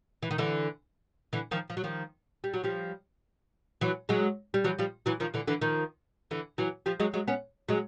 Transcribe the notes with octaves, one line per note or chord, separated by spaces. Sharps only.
E3
D#3
D3 E3
D3 E3
D#3 F3
F3
F#3
D#3 F3
G3
F#3
F3 G3
E3 F#3
F#3 G#3
G3
E3 F#3
F3 G3
E3 F#3
D#3 F3
D3 E3
D3 E3
D#3 F3
D3 E3
E3 F#3
F3 G3
F#3 G#3
F#3 G#3
B3 C#4
F#3 G#3